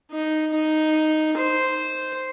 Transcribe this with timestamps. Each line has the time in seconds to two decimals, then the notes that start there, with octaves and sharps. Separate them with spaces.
0.11 D#4
0.54 D#4
1.38 C5